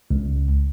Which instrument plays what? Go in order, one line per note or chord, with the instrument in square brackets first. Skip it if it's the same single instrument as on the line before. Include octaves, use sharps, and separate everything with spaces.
[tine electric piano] C#2